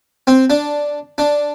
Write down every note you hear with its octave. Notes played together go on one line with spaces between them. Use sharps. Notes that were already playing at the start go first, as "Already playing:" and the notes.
C4
D4
D4